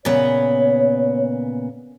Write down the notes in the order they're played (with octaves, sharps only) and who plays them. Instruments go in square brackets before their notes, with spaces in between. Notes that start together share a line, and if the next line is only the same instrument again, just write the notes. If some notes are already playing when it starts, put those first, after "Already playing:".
[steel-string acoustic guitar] A#2 C#3 B3 [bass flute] C#5